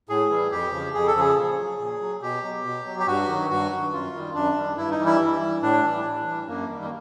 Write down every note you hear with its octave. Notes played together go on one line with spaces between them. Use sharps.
A2 G#4
E3 G3
F2 G4
C#3 F3
F2 G#4
A4
C#3 F3 G#4
A#2
F#3
A#2
F#3
B2 G4
F#3
B2
F#3
G4
G2 F#4
D#3 F#3
G2 F#4
D#3 F#3
F#2 F4
D#3 G3
F#2 D4
D#3 G3
G2 E4
D#4
E3 G3
E4
G2
E3 G3
A2 D4
E3 G3
A2
E3 G3
F#2 A#3
D#3 G3
A#3